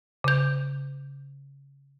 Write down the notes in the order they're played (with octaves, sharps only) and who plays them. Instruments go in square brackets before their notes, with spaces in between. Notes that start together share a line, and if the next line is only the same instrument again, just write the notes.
[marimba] C#3 G6